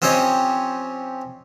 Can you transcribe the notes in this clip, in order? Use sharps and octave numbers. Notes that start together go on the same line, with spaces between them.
F3 C4 C#4 G4 C#5 D#5